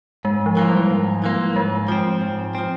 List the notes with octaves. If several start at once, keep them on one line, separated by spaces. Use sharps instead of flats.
G#2 G#3
F3
E3 A#3 F4
G3
G#2
E3 A#3 F4
G#2 G#3
F3 C4
G#2
F3 C4